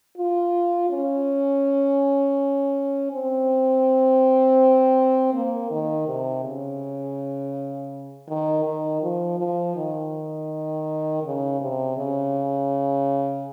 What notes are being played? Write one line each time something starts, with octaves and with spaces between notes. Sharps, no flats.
F4
C#4
C4
A#3
D#3
C3
C#3
D#3
D#3
F3
F3
D#3
C#3
C3
C#3